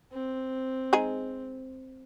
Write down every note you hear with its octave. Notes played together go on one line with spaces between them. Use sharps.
C4
G#3 D#4 G#4